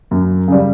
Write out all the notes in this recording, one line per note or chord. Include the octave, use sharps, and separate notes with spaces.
F#2
C#3 G3